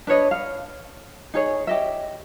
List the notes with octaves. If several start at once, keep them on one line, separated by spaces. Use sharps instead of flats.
D4 B4 C#5 D#5
F5
D#4 G#4 C#5
G4 D#5 E5